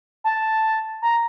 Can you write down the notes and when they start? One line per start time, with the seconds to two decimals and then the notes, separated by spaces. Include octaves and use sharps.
0.24 A5
1.02 A#5